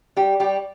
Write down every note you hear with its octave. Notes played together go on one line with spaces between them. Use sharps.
G3 G4
G3 G4